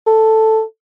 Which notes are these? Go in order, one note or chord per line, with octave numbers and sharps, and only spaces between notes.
A4